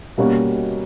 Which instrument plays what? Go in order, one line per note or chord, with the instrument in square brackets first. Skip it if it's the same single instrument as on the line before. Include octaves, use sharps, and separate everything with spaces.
[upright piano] B2 G3 A#3 C#4 F#4